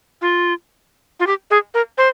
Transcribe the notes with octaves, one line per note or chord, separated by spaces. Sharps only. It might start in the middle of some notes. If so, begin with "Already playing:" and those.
F4
F4
G4
G#4
A#4
C5